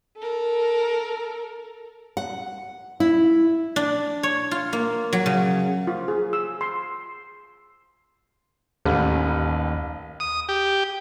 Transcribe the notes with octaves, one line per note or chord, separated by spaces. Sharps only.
A4 A#4
F#5
E4
D4
C#5
F4
A#3
F#3
C#3
F4
G#4
E6
C6
A1 D#2
D#6
G4